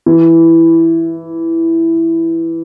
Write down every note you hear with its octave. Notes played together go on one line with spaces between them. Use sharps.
E3